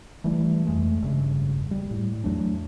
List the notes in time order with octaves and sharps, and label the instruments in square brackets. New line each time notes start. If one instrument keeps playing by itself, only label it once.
[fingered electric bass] E3 G3 A3
F2 G#3 A3
E1 G2 C#3
G3
A2
E2 F#3 A3 D4